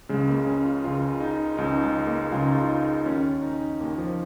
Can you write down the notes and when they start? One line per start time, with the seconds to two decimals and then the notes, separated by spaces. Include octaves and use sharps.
0.09 C#2 C#3 G#3
0.28 A#3
0.47 C#4
0.65 F4
0.84 C#2 C#3 F4
1.20 D#4
1.57 C#2 C#3 D#4
1.83 G#3
2.07 A#3
2.32 C#2 C#3 F4
2.42 D#4
2.52 F4
2.68 D#4
3.06 D#2 D#3 C#4
3.43 D#4
3.80 D#2 D#3 A#3
3.98 F3